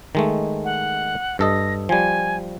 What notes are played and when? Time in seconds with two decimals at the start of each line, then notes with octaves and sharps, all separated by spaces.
0.15 D#3 G#3 A3
0.65 F#5
1.39 G2 A4 D#5 A#6
1.89 F3 G3 G#5